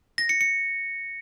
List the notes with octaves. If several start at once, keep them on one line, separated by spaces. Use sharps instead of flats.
A#6
C#7
C#7